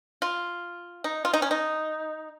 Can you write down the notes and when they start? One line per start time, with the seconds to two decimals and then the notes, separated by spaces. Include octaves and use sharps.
0.22 F4
1.04 D#4
1.25 F4
1.33 D#4
1.42 C#4
1.51 D#4